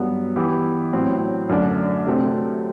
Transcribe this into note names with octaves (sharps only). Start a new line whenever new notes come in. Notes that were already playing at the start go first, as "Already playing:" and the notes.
Already playing: G2 F#3 B3
E3 B3 E4 G4
A2 F#3 C4
F#2 D3 A3 D4
C3 F#3 A3 C4